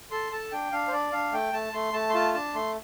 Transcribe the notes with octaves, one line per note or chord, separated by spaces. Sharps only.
A4 C6
A4 A5
D4 G5
D4 F5
C5
D4 D5
D4 F5
A3 G5
A3 A5
A3 C6
A3 A5
C6
F4 A5
D4 A5
A3 C6